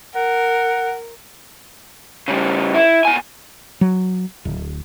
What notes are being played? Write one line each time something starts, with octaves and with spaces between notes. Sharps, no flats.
A#4 F#5
C#3 G3
E4
B2 G#5
F#3
D1